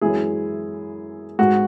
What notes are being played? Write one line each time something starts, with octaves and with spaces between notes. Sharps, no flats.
F#2 E3 G#3 E4 G#4
G#2 G#3 F#4